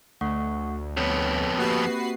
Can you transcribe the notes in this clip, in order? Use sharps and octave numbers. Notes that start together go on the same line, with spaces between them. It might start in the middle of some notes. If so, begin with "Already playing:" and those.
D2 A3 F#5 C#6
F2 B3 C#5
A#3 C4 F#4 G4 B4 C7